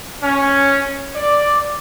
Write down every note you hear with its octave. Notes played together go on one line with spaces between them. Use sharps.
C#4
D5